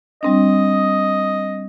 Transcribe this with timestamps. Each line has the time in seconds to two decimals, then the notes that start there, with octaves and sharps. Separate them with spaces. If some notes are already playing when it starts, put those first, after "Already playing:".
0.23 G3 C4 D4 D#5